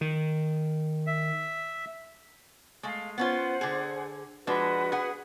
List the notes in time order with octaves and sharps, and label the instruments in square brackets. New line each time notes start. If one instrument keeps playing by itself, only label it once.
[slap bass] D#3
[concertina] E5
[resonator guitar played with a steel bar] G#3 A3 [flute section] F5
[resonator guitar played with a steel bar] B3 C#4 F4 [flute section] C5 F#5
[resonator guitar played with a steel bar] D3 G#4
[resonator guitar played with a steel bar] F3 G#3 D4 [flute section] F#4 B4
[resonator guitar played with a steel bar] G#4 F#5